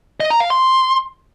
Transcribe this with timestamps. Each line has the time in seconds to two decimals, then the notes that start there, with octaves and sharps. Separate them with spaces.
0.20 D#5
0.30 A#5
0.40 F5
0.50 C6